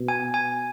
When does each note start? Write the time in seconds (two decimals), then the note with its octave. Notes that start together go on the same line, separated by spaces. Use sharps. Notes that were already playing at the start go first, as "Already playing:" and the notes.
Already playing: B2
0.08 G#5
0.34 G#5